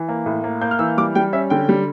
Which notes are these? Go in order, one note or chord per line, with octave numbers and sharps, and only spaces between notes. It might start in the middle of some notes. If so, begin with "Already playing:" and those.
Already playing: E3
A#3
A2
A#3
A#3 G6
F6
E3 E6
G3 D6
G3 G5
C#4 E5
D3 G5
G3